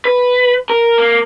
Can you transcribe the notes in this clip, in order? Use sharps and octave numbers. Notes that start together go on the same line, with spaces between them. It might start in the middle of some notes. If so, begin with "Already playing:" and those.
B4
A#4
A#3